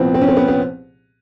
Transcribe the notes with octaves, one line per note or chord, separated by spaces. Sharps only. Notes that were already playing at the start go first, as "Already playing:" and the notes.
Already playing: C2 A#2 F3 B3 C4
C4
C#4
C4
B3
B3